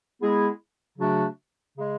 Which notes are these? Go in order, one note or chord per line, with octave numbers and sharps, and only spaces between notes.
G#3 B3 E4 G#4
C#3 F#3 A3 D4 F#4
C#3 G#3